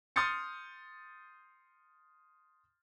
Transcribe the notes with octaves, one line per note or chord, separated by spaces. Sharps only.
C6 D#6 F6 G6 A6 C#7